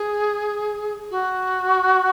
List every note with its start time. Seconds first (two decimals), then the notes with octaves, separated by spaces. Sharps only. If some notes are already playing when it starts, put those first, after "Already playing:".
Already playing: G#4
1.10 F#4